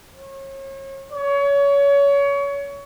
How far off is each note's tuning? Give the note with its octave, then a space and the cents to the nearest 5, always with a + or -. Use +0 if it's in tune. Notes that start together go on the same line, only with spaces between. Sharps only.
C#5 -35
C#5 +25